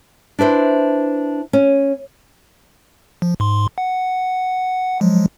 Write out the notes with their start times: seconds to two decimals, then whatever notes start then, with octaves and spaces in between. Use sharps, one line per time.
0.39 D4 E4 B4 C5
1.53 C#4
3.22 F3
3.40 G#2 C6
3.78 F#5
5.01 F3 F#3 G#3